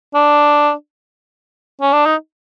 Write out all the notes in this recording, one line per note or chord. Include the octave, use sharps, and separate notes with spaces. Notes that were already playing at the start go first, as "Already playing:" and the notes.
D4
C#4
D4
D#4